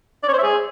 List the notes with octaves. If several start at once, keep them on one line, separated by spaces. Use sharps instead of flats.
D5
C#5
C5
E5
G#4